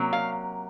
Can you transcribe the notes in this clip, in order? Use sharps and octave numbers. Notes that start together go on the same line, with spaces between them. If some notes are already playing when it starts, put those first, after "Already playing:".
Already playing: C3 F#3 A#3 C#4
F5